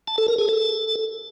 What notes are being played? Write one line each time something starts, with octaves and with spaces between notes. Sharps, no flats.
A5
A4
A#4
G#4
A4